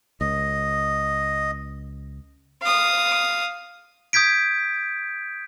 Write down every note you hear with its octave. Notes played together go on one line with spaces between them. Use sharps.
C#2 D#5
F5 D#6
D#6 G6 G#6 B6 D7